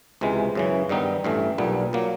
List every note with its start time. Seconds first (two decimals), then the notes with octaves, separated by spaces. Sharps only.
0.21 C#2 C3 E3 G#3
0.55 F#2 C#3 E3
0.89 G2 D#3 G3 B3 D#4
1.24 A1 G2 E3 A3
1.58 B1 A#2 G3 B3
1.93 A#2 F#3 A#3